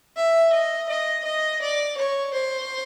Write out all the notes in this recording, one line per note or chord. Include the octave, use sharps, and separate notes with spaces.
E5
D#5
D#5
D#5
D5
C#5
C5